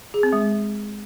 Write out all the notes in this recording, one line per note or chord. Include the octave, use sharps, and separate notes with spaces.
G#4
C4
G#3